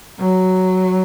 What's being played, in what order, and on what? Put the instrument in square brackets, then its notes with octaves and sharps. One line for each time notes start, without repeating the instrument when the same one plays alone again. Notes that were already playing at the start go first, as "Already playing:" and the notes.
[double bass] F#3